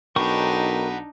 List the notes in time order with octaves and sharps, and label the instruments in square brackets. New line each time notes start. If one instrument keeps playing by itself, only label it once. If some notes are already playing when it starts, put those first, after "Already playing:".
[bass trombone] B1 [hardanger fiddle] D4 D#4 [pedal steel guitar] A#4 G5 C#6 [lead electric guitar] F#5 B5